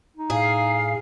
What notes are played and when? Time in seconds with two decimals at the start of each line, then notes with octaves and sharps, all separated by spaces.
0.17 D#4
0.30 A2 G#4 F5